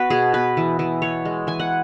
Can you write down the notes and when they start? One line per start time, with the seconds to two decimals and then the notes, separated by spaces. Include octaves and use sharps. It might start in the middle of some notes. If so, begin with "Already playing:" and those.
Already playing: B3 F#4 B4
0.10 B2 G#4
0.34 B3 B4
0.57 E3
0.79 E3
1.02 B3 C#5
1.25 G#3
1.47 E3 G#5
1.60 F#5